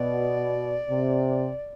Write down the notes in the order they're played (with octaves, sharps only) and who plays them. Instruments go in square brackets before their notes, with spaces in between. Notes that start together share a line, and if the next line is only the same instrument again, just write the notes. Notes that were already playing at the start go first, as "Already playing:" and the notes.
Already playing: [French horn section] B2 [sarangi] D5
[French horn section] C3